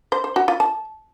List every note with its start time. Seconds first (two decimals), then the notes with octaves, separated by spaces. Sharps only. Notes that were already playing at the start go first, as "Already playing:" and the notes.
0.12 C5
0.24 C5
0.36 F#4
0.48 F4
0.60 A5